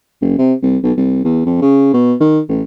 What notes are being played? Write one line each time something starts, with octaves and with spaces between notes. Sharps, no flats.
F#1
C3
C2
B1
C2
E2
F2
C#3
B2
D#3
A1